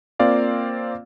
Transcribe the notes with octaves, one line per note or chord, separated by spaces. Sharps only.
A#3 C4 F4 D5 F5